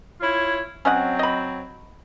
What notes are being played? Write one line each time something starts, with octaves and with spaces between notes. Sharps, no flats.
E4 F4 C#5
F#3 C4 C#4 D#5 F#5
D#5 B5